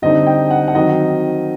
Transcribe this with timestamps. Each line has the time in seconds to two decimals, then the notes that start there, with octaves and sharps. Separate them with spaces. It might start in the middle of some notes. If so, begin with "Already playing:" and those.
0.02 D3 G3 C4 D#4 D#5
0.26 G5
0.51 F#5
0.68 F#5
0.75 D#3 F#3 C4 D#4 D#5